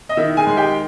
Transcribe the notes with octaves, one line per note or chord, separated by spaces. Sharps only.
D#5
D#3 E4 E5
G#4 G#5
G#3
G4 G5